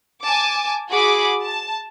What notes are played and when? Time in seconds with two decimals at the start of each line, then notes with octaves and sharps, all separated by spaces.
0.23 G#5 A5 D6
0.92 F#4 G#4 B5 D6
1.41 A5